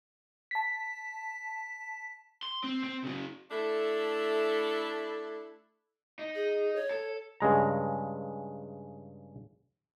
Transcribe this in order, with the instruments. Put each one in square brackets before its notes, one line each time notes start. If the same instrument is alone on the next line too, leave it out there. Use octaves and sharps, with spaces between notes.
[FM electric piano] A5 B6
[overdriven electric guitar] C6
C4
C4
C#3 F#3
[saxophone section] A3 D4 E4 A4
[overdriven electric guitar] D#4
[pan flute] G#4
C#5
[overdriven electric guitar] A4
[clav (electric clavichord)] G2 C#3 G#3 A#5